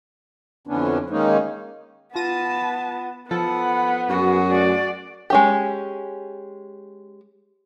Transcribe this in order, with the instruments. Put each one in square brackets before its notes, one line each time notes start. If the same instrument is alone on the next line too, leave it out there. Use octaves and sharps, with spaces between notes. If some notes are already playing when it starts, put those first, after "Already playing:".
[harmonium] F2 D3 E3 B3 C#4 D4
D#3 G#3 A#3 C#4 D#4
[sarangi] B3 [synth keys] F4 A#6 D#7 [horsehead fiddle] A5
[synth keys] F3 A4 [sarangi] B3 [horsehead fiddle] F#5
[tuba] F#2 [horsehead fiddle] F#4 G#4
[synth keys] A3 [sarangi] D5
[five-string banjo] G#3 C#4 G4